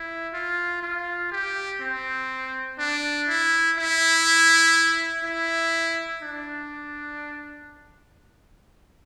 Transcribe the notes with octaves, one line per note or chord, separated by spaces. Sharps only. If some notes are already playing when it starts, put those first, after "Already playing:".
Already playing: E4
F4
F4
G4
C4
D4
E4
E4
E4
D4